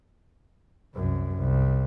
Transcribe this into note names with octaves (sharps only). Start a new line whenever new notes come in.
C2 F#2
C2